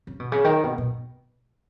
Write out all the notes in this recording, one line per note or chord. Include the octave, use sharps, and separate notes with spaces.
C#3
B2
C#3
D#3
B2
B2